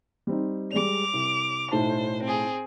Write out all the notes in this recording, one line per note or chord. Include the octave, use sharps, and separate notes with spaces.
G3 C4 D#4
G3 G#3 D5 D6 F7
C2
B1 A2 C5 A5
C4 G#4